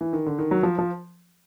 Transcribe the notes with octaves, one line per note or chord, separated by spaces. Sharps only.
E3
D#3
D3
D#3
F#3
F3
F3